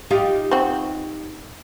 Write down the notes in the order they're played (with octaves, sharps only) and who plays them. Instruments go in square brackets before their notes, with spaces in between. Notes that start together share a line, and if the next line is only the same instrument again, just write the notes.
[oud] D#4 F4 G4
[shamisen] C4 F#4